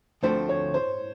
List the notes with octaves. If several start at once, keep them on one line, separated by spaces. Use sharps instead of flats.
D2 D3 F3 A3 C4 C5
C#5
C5